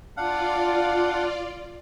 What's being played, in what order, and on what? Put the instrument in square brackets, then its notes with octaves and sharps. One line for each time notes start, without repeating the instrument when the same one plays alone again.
[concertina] D4 F5 F#5 [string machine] F4 D5